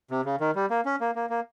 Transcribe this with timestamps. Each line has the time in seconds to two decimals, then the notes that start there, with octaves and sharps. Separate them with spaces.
0.11 C3
0.25 C#3
0.40 D#3
0.55 G3
0.70 A#3
0.85 C#4
1.00 A#3
1.15 A#3
1.30 A#3